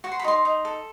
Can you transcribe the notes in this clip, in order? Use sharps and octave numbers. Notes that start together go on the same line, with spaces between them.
F#4 C#6
C6
B5
D#4 C6
D#4
A4